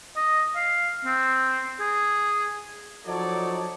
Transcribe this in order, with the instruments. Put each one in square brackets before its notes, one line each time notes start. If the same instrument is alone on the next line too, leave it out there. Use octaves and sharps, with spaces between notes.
[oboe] D#5
F5
C4
G#4
[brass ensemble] F3 F#3 D#4 A4 C#5 D5